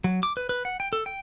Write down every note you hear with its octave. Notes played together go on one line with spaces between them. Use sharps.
F#3
D6
B4
B4
F#5
G5
A4
G5